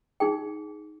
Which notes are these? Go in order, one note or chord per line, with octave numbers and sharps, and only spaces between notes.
D#4 G#4 G5